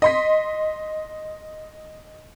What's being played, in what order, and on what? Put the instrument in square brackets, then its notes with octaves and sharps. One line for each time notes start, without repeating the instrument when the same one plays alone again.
[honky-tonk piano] D#5 C6 B6